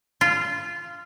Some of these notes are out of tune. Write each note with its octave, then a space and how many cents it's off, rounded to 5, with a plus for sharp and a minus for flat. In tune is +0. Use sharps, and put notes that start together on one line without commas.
F4 -15